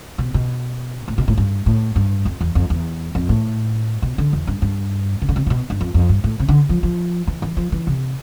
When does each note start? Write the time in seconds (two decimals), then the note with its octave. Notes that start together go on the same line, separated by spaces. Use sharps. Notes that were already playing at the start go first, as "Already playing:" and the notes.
0.18 B2
0.34 B2
1.08 A2
1.18 B2
1.28 A2
1.37 G2
1.66 A2
1.96 G2
2.25 F2
2.41 E2
2.55 F2
2.70 E2
3.15 F2
3.29 A2
4.02 B2
4.18 D3
4.33 E2
4.47 G2
4.62 G2
5.22 C3
5.29 D3
5.36 C3
5.46 C3
5.50 B2
5.70 G2
5.81 F2
5.94 F2
6.09 G2
6.24 A2
6.40 C3
6.48 D3
6.69 F3
6.83 F3
7.27 E3
7.42 E3
7.57 F3
7.72 E3
7.87 C3